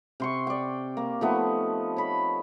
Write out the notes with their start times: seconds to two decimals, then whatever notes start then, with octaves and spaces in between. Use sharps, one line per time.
0.20 C3 C6 C#6
0.47 D5 G5
0.97 A#3
1.21 F3 A3 B3 D#4
1.97 C#5 B5